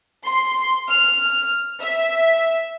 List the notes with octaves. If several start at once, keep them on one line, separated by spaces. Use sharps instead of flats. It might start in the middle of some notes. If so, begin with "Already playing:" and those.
C6
F6
E5